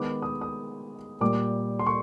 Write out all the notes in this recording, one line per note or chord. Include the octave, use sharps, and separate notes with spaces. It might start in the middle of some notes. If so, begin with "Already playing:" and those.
Already playing: D#3 G#3 B3 D6
D#6
D#6
A#2 G3 A#3 D6
C6
C#6